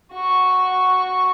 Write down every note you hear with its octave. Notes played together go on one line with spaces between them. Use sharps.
F#4 C#6